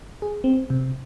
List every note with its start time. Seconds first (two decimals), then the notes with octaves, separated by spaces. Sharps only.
0.22 G#4
0.44 C4
0.70 C3